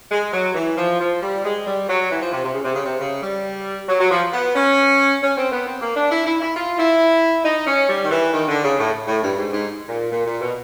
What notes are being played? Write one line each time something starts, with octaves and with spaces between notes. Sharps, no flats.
G#3
F#3
E3
F3
F3
G3
G#3
G3
F#3
E3
F3
C3
C3
C#3
C3
C#3
C3
C#3
G3
F#3
F#3
F3
B3
C#4
C#4
C4
B3
C4
A#3
D4
E4
E4
E4
F4
E4
D#4
C#4
G3
D#3
E3
D#3
D3
C#3
A2
A2
G2
G#2
G#2
A#2
A#2
A#2
B2